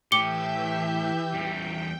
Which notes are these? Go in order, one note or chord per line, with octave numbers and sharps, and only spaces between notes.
A2 E3 G4 E5 D6 G6 C#7 G7
E2 G3 G5